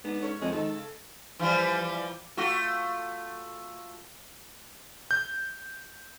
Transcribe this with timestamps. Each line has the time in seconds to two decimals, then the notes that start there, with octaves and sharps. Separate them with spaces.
0.04 G#2 B3 D4
0.22 C#4 A4 C#5
0.42 F2 B2 G#3 C5
0.53 G#2 D#3 A4 A5
0.74 C#3
1.39 E3 F3 G3
2.37 A3 F4 F#4
5.11 G6